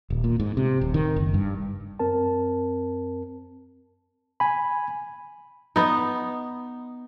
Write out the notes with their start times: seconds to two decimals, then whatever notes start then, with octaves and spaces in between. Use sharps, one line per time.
0.10 D#1
0.24 A#2
0.40 G#2
0.57 C3
0.81 D1
0.94 D#3
1.16 F#1
1.34 G2
1.99 F#2 C4 A#4 A5
4.40 G#5 B5
5.76 B3 D#4